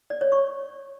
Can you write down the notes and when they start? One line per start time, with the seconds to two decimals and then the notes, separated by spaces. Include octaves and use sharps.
0.10 D5
0.21 C#5
0.32 C#6